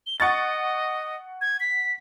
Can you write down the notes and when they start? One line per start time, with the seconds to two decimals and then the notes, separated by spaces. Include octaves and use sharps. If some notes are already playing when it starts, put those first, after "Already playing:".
0.06 G7
0.20 D#5 F#5 C#6 A6
1.41 G#6
1.60 B6